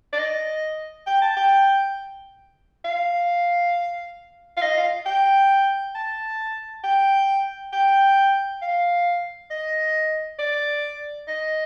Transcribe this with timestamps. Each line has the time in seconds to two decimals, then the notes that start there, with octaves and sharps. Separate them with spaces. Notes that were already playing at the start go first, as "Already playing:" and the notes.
0.13 D5
0.18 D#5
1.07 G5
1.22 A5
1.37 G5
2.85 F5
4.57 F5
4.62 D#5
4.77 F5
5.06 G5
5.95 A5
6.84 G5
7.73 G5
8.62 F5
9.50 D#5
10.39 D5
11.28 D#5